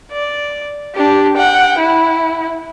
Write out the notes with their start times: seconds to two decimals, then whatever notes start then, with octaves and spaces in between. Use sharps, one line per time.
0.12 D5
0.95 D4 G4
1.37 F#5 G5
1.79 E4